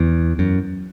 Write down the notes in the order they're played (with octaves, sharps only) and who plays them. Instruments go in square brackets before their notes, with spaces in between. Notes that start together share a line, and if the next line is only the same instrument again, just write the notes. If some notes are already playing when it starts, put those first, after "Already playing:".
Already playing: [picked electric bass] E2
F#2